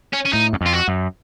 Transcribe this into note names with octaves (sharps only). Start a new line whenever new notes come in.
C#4
C#4
A2 D#4
F#2
F2
F4
F#4
F#2